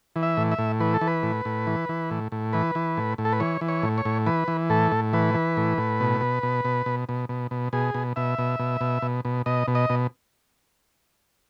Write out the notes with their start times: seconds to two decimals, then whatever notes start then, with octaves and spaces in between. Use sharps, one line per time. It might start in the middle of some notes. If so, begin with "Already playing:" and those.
0.16 E3
0.23 E5
0.37 A2
0.52 E5
0.58 A2
0.80 E3 B4
0.94 A4
1.01 E3
1.07 B4
1.23 A2
1.45 A2
1.67 E3
1.89 E3
2.11 A2
2.32 A2
2.53 E3 B4
2.75 E3
2.97 A2
3.18 A2
3.25 A4
3.33 B4
3.40 E3 C#5
3.61 E3
3.69 C#5
3.83 A2
3.98 C#5
4.05 A2
4.26 E3 B4
4.48 E3
4.70 A2 A4
4.92 A2
5.13 E3 B4
5.34 E3
5.57 A2
5.78 A2
6.00 B2
6.21 B2
6.43 B2
6.65 B2
6.86 B2
7.09 B2
7.29 B2
7.51 B2
7.73 B2 G#4
7.95 B2
8.16 B2 E5
8.39 B2
8.60 B2
8.81 B2
9.02 B2
9.25 B2
9.46 B2 D#5
9.68 B2
9.75 D#5
9.90 B2